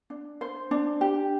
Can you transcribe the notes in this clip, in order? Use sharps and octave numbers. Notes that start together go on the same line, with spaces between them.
D4
C5
D4
G4